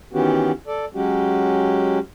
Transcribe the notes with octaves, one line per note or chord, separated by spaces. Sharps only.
D#3 E3 B3 C#4 F#4 G4
A4 D5
F#3 G#3 C#4 F#4 G4